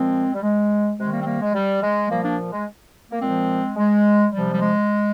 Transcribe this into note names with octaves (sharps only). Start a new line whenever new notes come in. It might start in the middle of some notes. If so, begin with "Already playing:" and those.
Already playing: A#2 F3 G#3 C4
G3
G#3
C3 D#3 G#3
G3 A#3
C4
G3 A#3
G#3
G3
G#3
A#2 F3 G3 A#3
A#3 D4
G#3
A#3
A#2 F3 G#3 C4
G#3
C3 F3 G3
G3
G#3